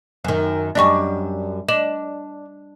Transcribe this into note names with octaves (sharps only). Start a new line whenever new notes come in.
F#2 D#3
F#2 G3 D4 D5 D#5 C#6
D4 D#5 E7 F#7